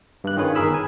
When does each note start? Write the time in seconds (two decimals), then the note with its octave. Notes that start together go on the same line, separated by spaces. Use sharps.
0.24 G2 F#6
0.36 D#3 C#4 F4 G#4 B4 C#5
0.55 G1 D#3 G#4 A#4 B5 E6
0.74 G#5